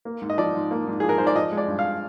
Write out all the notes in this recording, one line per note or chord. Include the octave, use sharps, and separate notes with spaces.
A#3
G#2
D#5
F3 D5
G#2
A#3
G#2
F3 G#4
A#4
G#2 C5
D5
F3 D#5
G#3
D5
G2
F5